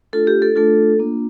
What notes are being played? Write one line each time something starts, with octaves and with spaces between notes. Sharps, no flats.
A3 D4 F4 A4
G4
A4
A3 D4 F4 A4
A#3 D4 F4